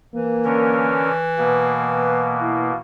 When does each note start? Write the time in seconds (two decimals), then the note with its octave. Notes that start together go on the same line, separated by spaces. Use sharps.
0.14 E3 A#3
0.45 D3 C#4 A#4
1.38 B2 A#3 B4
2.41 E4